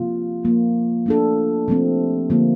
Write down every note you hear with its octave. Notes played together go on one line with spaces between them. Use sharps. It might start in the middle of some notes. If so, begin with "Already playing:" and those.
Already playing: C3 F3 A#3 F4
C3 F3 A#3
A3 D4 A4
C3 F3 A3 C4
D3 F3 A#3